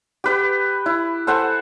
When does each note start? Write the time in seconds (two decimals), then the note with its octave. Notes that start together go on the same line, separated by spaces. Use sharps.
0.24 G4 B4 G5
0.86 E4
1.27 A4 C5 F#5 G#5